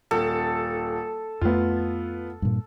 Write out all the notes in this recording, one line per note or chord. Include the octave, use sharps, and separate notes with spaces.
D#1 A4
F2 A3 B3 F4
G2 A#2